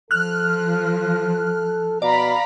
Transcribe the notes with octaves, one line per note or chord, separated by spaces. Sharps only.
F3 A4 F6 F#6
B2 D5 F5 A#5 B5